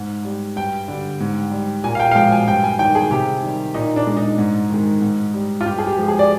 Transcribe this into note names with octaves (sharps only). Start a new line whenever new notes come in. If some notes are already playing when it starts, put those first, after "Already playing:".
Already playing: G#2
G3
G2 G5
D3 G3
G#2
G3
A#2 G#5
F5
G5
F5
F3 G#3 G5
G#5
G2 G5
G#5
D#3 G3 G5
G#4
C3 G4
D#3 G3
A#2 D#4
D4
G#3
D#4
G#2
D#3 G#3
G#2
G3
F4
G2 G4
G#4
G4
F3 G#3
G#4
D5